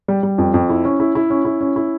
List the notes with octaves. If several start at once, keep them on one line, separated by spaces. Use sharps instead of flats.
G3
G3
F2
F2
E4
C#4
E4
E4
C#4
E4
C#4
E4